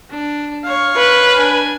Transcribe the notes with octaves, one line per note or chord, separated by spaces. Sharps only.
D4
C#5 F5
B4
D4 G#5